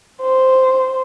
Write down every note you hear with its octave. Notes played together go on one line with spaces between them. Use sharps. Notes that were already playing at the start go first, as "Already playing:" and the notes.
C5